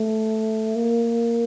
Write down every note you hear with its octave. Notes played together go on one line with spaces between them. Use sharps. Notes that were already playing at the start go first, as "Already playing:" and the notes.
Already playing: A3
A#3